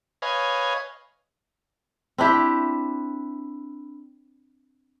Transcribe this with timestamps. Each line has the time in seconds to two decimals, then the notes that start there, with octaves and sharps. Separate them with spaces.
0.22 B4 C#5 D#5 F5 G#5
2.18 C4 D4 E4 G4